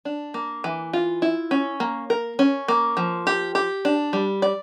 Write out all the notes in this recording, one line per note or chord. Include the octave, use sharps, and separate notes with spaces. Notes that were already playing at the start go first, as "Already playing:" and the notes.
D4
A#3
E3
F4
E4
C#4
A#3
A#4
C#4
A#3
F3
G4
G4
D4
G3
D5